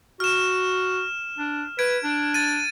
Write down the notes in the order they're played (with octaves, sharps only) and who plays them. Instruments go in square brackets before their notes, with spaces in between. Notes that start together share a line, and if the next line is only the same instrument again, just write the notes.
[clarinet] F#4 [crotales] F6 E7
[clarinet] D4
[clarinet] B4 [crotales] G#6 D7
[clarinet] D4
[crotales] A6 D#7